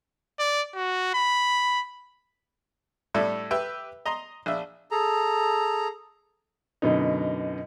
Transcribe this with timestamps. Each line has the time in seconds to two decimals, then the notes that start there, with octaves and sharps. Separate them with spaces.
0.39 D5
0.75 F#4
1.14 B5
3.14 A2 G3 D4 A4 E5
3.51 G4 B4 E5 G5
4.06 D#5 A#5 C6
4.46 A#1 D4 E5
4.91 G#4 A4 A#5
6.82 F#2 B2 D3 D#4